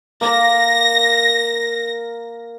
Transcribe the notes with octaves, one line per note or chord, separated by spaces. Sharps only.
A#3 A#4 A#6